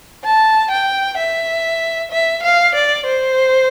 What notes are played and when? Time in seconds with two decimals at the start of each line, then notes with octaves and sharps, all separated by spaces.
0.24 A5
0.71 G5
1.18 E5
2.11 E5
2.43 F5
2.75 D5
3.06 C5